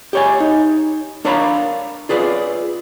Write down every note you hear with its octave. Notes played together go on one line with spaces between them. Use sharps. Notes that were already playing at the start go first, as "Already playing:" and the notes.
G4 C#5 G#5
D#4
D4 A#4 C#5 F5 A#5 B5
F4 G#4 B4 D5